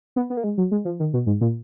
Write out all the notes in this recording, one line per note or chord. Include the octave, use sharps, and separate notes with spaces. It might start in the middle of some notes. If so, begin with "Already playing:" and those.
B3
B3
A#3
G#3
F#3
G#3
F3
D#3
B2
G#2
A#2